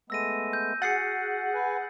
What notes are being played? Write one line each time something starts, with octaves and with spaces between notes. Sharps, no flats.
G#3 A3 B3 E6 A#6 D#7
G6
F#4 G#4 F#5 A6 C7 C#7
B4 G#5